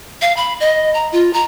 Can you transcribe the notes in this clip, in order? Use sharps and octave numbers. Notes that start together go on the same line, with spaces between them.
F5
B5
D#5
A#5
F4
A#5